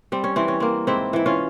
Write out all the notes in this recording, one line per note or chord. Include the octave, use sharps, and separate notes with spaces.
G3 C4
C#4
E3 C4
C#4
A#3 C4
G#2 C4 E4
E3 E4
C#4 F4